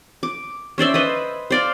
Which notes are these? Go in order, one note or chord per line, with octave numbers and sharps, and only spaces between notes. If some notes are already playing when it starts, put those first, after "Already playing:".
D6
C#4 C5 D5 E5
B4 C5 D#5
C5 D5 F5